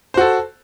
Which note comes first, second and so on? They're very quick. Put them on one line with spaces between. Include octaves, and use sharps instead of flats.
C5 F#4 A4